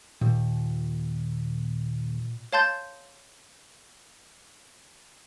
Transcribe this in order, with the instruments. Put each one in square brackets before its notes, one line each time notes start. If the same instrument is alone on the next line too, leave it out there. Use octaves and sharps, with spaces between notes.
[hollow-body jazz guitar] D#2 [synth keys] A#2
[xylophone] C#5 F5 A5 C6 G6 A6